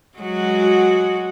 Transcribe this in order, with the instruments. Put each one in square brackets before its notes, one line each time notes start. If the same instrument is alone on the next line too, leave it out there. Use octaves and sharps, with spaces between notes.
[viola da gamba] F#3 G#3 F#4